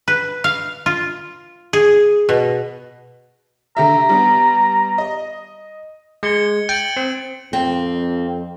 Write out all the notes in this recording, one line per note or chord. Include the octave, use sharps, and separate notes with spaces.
B4
F5
F4
G#4
B2
D3 G4 E5 A#5
G3 B3
D#5
G#3 G#6 C#7 G7
G5 A6 D7 F#7
C4
F2 C4